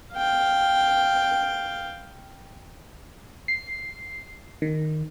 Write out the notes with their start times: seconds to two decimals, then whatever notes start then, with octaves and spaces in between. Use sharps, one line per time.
0.14 F5 G5
3.48 C7
4.62 D#3